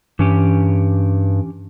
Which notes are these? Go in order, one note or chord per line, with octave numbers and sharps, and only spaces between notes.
G2 E3 C#4 G4